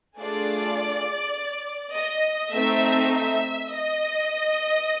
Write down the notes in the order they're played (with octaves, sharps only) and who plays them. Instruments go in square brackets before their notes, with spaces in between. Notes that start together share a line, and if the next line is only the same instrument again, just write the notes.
[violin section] A3 D4 F4 G#4 D5
D#5
A3 C4 D#4 E5
E5
D#5